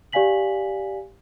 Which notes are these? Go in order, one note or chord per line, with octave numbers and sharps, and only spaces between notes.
G4 D5 F5 G#5 B6 F#7